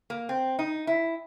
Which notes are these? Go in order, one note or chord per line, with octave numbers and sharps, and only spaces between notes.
A#3
C4
D#4
E4